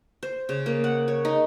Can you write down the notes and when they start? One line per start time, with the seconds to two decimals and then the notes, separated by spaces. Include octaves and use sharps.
0.23 C5
0.49 C#3
0.66 A#3
0.84 F#5
1.08 C#5
1.25 D#4